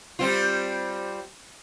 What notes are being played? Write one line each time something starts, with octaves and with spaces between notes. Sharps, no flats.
G3 C4 F4